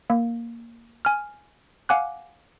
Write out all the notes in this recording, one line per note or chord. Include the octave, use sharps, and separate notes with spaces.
A#3
G#5 F6
F5 F#5 G#5 D6 F#6